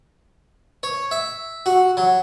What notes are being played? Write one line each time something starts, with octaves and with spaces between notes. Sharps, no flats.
C#5
E5
F#4
F#3